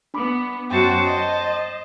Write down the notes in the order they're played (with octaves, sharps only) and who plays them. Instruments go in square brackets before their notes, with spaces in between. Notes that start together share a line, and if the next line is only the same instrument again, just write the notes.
[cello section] B3 [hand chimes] D4 B5 D6
[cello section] F#2 F#4 [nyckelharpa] C5 A5 [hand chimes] G5
[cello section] D#5